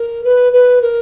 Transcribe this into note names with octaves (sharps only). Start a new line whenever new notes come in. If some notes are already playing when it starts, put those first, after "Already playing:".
Already playing: A#4
B4
B4
A#4